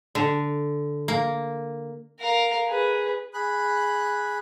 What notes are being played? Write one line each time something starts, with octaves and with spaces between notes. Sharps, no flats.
D3
A#3
A#4 F5
G#4 B4
G#4 B5 F#6